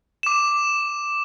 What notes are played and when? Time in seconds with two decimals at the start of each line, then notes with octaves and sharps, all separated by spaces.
0.23 D6 E7